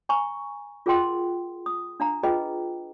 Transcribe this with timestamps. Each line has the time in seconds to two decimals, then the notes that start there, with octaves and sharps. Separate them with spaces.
0.09 G#5 A#5 C#6
0.86 F4 G#4 A#4 F#5 G5 C6
1.66 D#6
2.00 D4 F5 A#5
2.23 F4 G#4 B4 D#5 G5